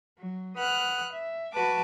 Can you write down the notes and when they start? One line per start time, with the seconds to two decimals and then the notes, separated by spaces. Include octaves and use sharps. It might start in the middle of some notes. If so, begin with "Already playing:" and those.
0.17 F#3
0.56 B4 F#5 D#6 F6 F#6
1.12 E5
1.52 F#4 B4 A5 D6